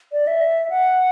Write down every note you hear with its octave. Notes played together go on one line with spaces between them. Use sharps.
D5
E5
F#5